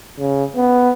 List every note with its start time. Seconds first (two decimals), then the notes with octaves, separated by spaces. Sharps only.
0.20 C#3
0.56 B3